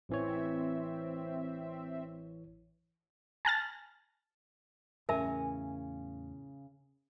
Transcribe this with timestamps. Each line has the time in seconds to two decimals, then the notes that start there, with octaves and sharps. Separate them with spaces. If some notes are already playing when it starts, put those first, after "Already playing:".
0.09 A1 E3 C4 C#5 E5
3.45 G#5 A5 F6 A6
5.09 E2 A2 C#3 E3 A#4 E5 G#5